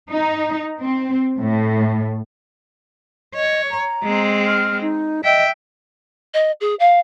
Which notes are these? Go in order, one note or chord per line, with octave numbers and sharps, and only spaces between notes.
D#4
C4
A2
C#5 D#5
A#5
G#3 C4
F6
D#4
D#5 E5 G5
D#5
G#4
F5